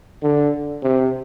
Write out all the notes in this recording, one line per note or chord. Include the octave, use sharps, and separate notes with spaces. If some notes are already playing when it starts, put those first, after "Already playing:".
D3
C3